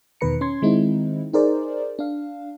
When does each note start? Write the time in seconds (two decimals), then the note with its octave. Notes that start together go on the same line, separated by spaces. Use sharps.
0.21 E2 B2 D#3 B4 A#5 C#7
0.41 C#4 C6 G#6
0.62 D#3 G#3 C4 D#4 E4
1.33 D#4 G#4 A#4 C5 D5
1.99 D4 F5